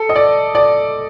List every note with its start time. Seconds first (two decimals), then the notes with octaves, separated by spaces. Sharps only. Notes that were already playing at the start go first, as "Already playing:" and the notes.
Already playing: A4
0.09 D#5
0.16 D5
0.55 D5